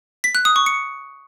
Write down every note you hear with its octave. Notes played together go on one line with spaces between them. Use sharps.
B6
F#6
D#6
C#6
C#7